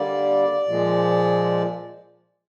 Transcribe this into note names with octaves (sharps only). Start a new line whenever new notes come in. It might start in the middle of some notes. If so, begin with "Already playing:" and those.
Already playing: D3 G3 A#3 D5
A#2 F3 G#3